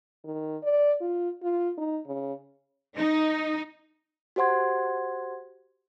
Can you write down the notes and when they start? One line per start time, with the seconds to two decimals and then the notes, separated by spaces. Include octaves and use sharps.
0.24 D#3
0.63 D5
1.01 F4
1.42 F4
1.78 D#4
2.06 C#3
2.98 D#4
4.36 F#4 G4 C5 F#5 C6 G#6